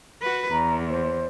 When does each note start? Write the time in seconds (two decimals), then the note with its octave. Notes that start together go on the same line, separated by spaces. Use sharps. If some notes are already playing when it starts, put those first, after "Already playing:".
0.22 F#4 B4
0.51 E2 A#5
0.90 C5